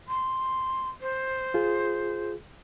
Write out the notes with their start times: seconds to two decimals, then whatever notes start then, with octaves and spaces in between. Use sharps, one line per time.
0.08 C6
1.01 C5
1.54 F4 G#4